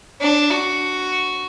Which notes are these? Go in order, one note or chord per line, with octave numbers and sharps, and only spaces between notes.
D4
F#4